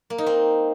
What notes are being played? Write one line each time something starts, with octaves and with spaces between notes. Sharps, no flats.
A#3
D#4
C4